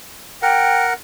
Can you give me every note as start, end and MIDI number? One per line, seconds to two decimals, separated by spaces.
0.42 0.93 70
0.42 0.93 78
0.42 0.85 79